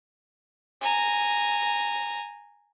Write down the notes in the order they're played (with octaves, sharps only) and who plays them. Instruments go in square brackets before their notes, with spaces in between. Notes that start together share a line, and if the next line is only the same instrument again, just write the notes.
[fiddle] G#5 A#5